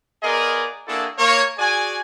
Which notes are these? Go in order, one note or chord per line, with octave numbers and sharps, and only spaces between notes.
B3 F4 G#4 A#4 D5 D#5
A#3 D4 E4 F#4 G#4 A4
A#3 C#5
F#4 G#4 D5 G#5